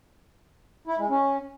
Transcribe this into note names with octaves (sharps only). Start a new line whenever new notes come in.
E4
G#3
C#4